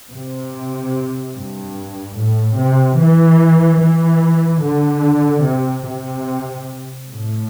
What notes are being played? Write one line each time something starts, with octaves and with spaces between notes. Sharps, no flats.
C3
G2
A2
C3
E3
E3
D3
C3
C3
A2